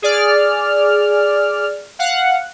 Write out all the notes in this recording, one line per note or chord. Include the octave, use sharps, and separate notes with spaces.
G#4 D5 F6
F5 F#5